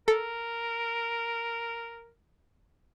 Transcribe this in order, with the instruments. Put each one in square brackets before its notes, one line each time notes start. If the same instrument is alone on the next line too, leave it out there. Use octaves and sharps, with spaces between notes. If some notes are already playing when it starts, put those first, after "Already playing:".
[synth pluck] A4 [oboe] A#4